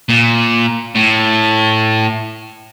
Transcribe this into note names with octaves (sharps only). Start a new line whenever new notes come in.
A#2
A2